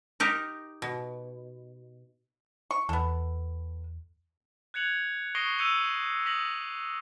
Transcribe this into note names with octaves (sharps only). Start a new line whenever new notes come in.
D#4 G4 A#4
B2
C#6
E2 B3 A4
F#6 G#6 C#7 F7 F#7
C#6 D#6 A#6 C7 D7 G7
E6 G6 C#7 D#7 F7
D#6 A#6 B6 F#7